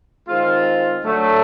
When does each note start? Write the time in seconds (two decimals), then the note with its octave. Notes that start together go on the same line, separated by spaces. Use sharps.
0.27 D#3 G#3 C4 F4
1.04 D3 F#3 A3